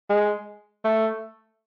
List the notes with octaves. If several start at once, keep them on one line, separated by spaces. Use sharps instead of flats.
G#3
A3